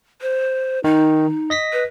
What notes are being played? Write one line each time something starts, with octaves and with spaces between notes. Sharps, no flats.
C5
D#3 D#4
D#5 A#6 B6
B4